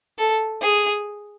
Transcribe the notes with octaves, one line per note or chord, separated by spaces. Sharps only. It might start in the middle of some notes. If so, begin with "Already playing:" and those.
A4
G#4